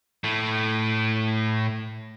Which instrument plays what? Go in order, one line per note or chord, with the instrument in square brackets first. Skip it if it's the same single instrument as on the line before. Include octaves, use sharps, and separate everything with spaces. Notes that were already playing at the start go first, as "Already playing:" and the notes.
[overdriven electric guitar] A2 A3